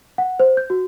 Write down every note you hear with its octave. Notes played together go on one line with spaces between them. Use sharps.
F#5
C5
G6
F#4